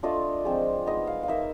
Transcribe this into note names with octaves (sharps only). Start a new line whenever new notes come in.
A3 D4 F4 D#5
F3 G#3 C4
G#3 B3 D#4 D#5
F5
F5
A#3 D#4 E5